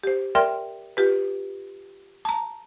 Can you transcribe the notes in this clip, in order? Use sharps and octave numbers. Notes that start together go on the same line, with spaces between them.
G4 C5
A#4 D5 E5 G5 C6 F6
F4 G4 B4
A5 A#5